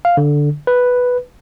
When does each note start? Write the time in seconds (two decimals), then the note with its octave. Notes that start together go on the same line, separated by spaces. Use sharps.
0.05 F5
0.17 D3
0.67 B4